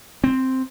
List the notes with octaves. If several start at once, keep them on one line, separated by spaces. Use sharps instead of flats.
C4